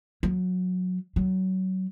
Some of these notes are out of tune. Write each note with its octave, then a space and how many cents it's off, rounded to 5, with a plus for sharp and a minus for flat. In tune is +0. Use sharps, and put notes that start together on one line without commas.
F#3 -20
F#3 +20